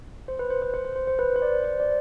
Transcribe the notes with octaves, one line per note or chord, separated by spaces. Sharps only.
C5
B4
C5
C5
C5
C5
C5
C5
B4
C5
D5
C5
D5